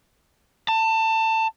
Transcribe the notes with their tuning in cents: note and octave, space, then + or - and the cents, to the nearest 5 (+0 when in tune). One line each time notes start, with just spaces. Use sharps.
A5 +20